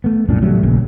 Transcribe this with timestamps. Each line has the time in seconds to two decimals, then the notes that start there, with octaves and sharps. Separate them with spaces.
0.04 A3 B3
0.28 C2 F#2 A#2 D4
0.42 A1 F#3 G3 A3
0.63 A#1 C#3 A#3